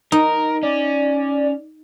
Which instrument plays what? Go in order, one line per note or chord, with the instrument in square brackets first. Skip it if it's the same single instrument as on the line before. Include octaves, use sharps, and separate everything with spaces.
[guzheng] D#4 [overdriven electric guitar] A#4
[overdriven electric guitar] C#4 [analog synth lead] D5